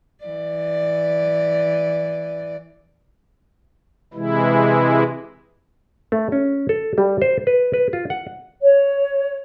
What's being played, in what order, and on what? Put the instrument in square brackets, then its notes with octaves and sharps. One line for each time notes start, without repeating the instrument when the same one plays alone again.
[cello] E3 D5
[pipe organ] C3 E3 G#3 E4
[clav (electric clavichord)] A3
C#4
A4
G3
C5
B4
B4
F4
F#5
[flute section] C#5